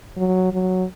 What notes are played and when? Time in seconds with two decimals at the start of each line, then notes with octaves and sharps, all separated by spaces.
0.17 F#3
0.53 F#3